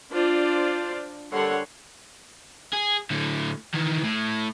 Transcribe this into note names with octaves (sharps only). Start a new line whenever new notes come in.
D4 F4 C5 D5
D3 G3 A#4 C#5 F#5 C6
G#4
A2 D3
D#3 E3
A2